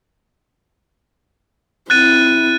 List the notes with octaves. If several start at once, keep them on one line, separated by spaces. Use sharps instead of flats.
C4 E4 F#6 A6 D#7